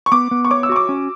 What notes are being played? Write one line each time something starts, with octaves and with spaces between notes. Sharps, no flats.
C#6
B3 D6
B3
C#6
C#5 D6
E6
F#4 C#6
D6
C#4